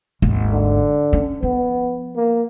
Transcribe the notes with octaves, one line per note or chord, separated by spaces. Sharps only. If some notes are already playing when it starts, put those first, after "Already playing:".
G#1 D#2
D3
C#4
F3 B3
A#3